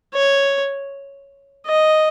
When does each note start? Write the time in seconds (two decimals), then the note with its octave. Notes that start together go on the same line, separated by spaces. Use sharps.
0.14 C#5
1.67 D#5